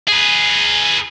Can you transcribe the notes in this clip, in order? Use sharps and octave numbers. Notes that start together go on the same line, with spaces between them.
G#4 B4